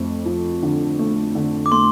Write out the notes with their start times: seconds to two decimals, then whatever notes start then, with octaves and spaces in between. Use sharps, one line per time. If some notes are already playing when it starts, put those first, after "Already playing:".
Already playing: F2 A3
0.25 F3
0.63 D3
0.99 A3
1.35 D3
1.66 D6
1.71 A3 C6